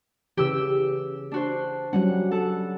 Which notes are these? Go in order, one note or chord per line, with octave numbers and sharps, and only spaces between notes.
C#3 E3 G4 E6
D4 F#4 C5
F#3 G3 C#4 F#5
A4 F#5